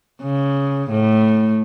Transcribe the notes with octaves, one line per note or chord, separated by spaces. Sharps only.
C#3
A2